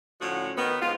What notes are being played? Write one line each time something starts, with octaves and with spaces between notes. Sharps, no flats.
A2 D3 F3 C#4 F#4
D#3 B3
G#2 F3 F4